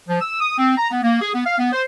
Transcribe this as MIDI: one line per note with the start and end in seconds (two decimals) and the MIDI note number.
0.09 0.21 53
0.21 0.36 88
0.40 0.54 87
0.58 0.76 60
0.77 0.88 82
0.91 1.02 59
1.03 1.19 58
1.21 1.29 68
1.34 1.45 59
1.46 1.58 77
1.59 1.69 59
1.73 1.82 72